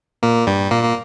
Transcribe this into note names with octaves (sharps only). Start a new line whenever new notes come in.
A#2 A#3
G2 G3
A#2 A#3
A#3